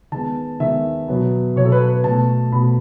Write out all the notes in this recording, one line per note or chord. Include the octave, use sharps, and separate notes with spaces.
D#3 G#3 B3 A5
D#3 G#3 B3 E5
B2 F#3 B3
B2 F#3 B3 C#5
A4
B4
B4
B2 A3 A5
B2 A3 B5